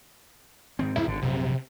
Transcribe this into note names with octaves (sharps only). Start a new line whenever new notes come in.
G#2 D#3 C4
E2 G#2 C3 E4
G#1 D3
A#1 F#2 C3